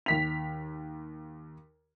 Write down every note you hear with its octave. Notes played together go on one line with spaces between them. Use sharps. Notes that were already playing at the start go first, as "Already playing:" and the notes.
D#2 B6 F7